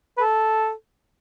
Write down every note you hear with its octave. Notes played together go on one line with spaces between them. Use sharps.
B4
A4